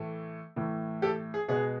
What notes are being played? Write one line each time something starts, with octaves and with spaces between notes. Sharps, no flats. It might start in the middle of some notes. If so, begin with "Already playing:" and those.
Already playing: A2 E3 A3
A2 E3 A3
G4 A4
G#4
B2 G#3 B3 G#4